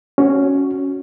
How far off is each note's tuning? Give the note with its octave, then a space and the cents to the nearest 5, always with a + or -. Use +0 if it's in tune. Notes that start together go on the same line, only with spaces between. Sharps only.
C#4 +0 F#4 +0